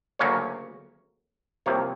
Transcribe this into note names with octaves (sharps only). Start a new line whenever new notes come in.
D2 C#3 F#3 A#3 C#4 C#5
C2 C3 F3 A#3 C#5